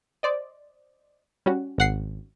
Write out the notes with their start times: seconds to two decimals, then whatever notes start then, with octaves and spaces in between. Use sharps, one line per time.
0.23 C5 D5 D#5
1.46 G3 C#4 F#4
1.78 G#1 F#5 C7